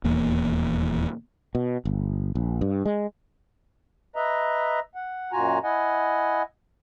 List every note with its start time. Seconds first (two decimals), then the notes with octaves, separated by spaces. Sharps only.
0.04 D#1 E2 A#3
1.55 B2
1.85 G1
2.35 A#1
2.61 G2
2.85 G#3
4.16 B4 D#5 E5 A#5
4.95 F#5
5.32 F#2 A#2 F4 F#4 G#5 A#5
5.64 E4 D#5 F#5 G#5